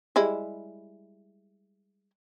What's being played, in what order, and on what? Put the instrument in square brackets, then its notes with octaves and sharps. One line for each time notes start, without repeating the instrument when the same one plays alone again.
[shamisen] G3 G#3 E4